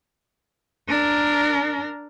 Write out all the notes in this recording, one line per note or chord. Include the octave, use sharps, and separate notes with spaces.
D4 A#4